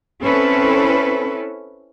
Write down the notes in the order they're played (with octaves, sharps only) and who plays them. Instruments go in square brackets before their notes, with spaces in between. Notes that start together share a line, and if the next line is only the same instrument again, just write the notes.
[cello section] C4 C#4 E4 A4 B4